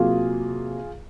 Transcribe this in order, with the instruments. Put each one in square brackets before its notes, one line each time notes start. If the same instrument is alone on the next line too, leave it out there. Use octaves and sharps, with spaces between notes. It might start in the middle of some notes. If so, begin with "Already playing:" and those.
Already playing: [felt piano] C3 F#3 A#3 F4 G#4